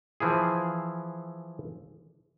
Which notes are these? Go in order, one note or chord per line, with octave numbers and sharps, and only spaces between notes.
E3 F3 E4 G#4